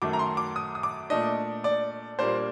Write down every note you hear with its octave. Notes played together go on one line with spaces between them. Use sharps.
F#2 D#3 F#3 A3 D6
A#5
C6
D6
D#6
D#6
D6
A#2 A3 D4 D#5
D5
A#2 G3 A#3 D4 C5